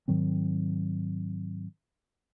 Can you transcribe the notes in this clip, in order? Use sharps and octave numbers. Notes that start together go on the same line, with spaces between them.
G#2 D#3 F#3 C4